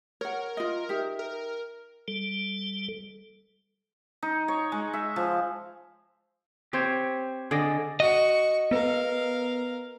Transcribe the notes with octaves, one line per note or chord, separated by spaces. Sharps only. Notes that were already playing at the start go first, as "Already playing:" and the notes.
A#4 C#5 F#5
F4 D#5
D#4 G4 E5
A#4
G3 A4
D#4
C#5
G#3
E5
F3
C4 G4 C5 C#5
D3 G#4 D5 D#5
F#4 D#5 C#6
B3 A#4 B4 F5